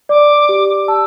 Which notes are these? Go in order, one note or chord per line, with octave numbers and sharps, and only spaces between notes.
D5 D6
G4
A5 E6